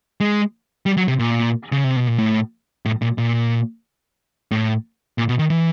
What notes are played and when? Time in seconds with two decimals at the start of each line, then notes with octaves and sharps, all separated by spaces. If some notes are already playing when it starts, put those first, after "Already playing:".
0.20 G#3
0.86 G3
0.97 F#3
1.08 C3
1.19 A#2
1.72 C#3
1.84 C3
1.96 B2
2.07 A#2
2.19 A2
2.85 A2
3.02 A#2
3.18 A#2
4.51 A2
5.18 A#2
5.29 B2
5.39 D#3
5.50 E3